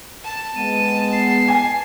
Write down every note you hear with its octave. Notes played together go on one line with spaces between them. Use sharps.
A5
G#3 B3 D#7
C7
G#5